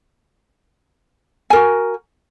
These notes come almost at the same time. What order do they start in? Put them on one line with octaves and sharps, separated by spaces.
G#5 A#4 F#4